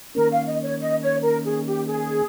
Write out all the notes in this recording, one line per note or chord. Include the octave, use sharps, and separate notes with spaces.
D#3 A#3 C#4 A#4
F5
D#5
C#5
D#5
C#5
A#4
G#4
G4
G#4